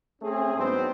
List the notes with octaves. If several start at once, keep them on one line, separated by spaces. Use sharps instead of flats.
A3 C4 C#4 G#4
G#2 F#3 B3 C4 D4